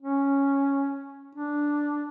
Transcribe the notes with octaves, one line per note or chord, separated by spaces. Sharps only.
C#4
D4